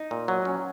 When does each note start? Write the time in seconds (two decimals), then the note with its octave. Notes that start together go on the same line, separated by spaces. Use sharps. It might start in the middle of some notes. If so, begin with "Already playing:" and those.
Already playing: D#4
0.11 A#2
0.28 F#3
0.45 C#4